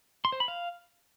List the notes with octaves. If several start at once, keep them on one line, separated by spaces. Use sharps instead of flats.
C6
C5
B5
F5